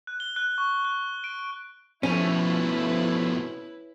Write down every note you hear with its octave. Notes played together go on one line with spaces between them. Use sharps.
F#6
G7
F#6
C#6
F#6
D7
B2 F3 A3 C#4 E4 B4